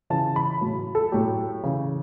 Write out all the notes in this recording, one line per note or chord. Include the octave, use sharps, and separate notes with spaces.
C#3 E3 A5
B5
A2 F#3
A4
A2 F#3 G4
C#3 E3